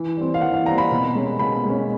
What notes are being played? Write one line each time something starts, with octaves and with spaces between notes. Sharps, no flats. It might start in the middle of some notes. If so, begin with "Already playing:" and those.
Already playing: E3
G3 C4
F5
E3 F#5
F5
G3 C4 A#5
B5
B2
G#3 C#4
B2 B5
G#3 C#4